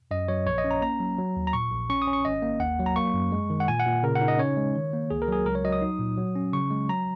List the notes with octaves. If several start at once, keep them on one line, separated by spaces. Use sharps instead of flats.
F#2 D#5
F#3 C#5
A#1 C#5
D#5
C#4
A#5
A#3 A#5
F#3
F#3
D#2
A#5
A#2 C#6
A#1
C#4 C#6
D#6
C#4
C#6
G#1 D#5
A#3
D#2 F#5
F#3
A#5
A#3 C#6
F#2
G#3
D#3
F#5
A#2 G#5
F#5
A#2
C#3 A#4
F#5
D#4
D#5
C#4 C#5
G#3
D#3
A#3
C#2 G#4
A#4
F#3 G#4
C#2 A#4
C#5
F#3 D#5
D#6
D#4
A#2
F#3
C#4
C#3 C#6
G#3
F#3 A#5